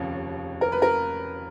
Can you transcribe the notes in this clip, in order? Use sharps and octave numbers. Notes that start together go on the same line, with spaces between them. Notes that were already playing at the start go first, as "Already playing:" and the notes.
Already playing: F1 D#2 C#3
A#4
B4
A#4